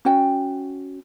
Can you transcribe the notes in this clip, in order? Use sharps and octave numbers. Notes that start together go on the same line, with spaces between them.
C#4 F#4 G5